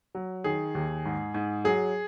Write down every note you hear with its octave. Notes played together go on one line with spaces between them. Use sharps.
F#3
D#3 G#4
D#2
G#2
G#2
F#3 G#4